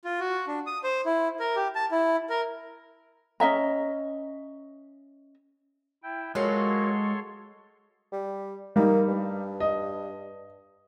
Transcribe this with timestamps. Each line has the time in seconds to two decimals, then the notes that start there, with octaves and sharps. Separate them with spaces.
0.05 F4
0.20 F#4
0.47 D4
0.66 D#6
0.84 C5
1.05 E4
1.40 A#4
1.56 G4
1.75 A5
1.91 E4
2.30 A#4
3.40 C#4 D#5 E5 A#5
6.03 E4 G5
6.35 F#3 G#3 A#3 F4 F#4 A4 C#5 C6
8.13 G3
8.76 G3 A#3 D#4
9.08 G2
9.60 D#5